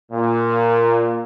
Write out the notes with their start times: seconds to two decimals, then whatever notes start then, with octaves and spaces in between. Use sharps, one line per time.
0.11 A#2